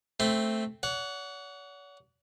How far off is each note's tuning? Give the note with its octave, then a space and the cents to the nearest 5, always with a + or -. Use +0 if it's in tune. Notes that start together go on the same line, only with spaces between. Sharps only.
A3 +0 C4 +0 C6 -20
C#5 +45 F#5 +0